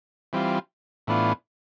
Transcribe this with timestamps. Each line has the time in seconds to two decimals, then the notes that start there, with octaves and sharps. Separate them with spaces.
0.33 E3 G3 C4 F4
1.07 A2 E3 B3 D4 F4